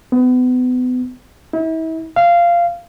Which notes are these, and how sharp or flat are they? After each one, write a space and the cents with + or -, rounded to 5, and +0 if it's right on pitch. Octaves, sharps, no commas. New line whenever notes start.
B3 +30
E4 -40
F5 -15